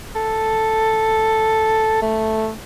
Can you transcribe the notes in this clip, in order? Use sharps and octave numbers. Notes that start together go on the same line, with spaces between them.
A4
A3